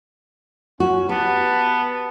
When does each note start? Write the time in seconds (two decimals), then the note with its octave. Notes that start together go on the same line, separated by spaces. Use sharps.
0.80 C#4 F#4
1.09 B3 G4 B4 A5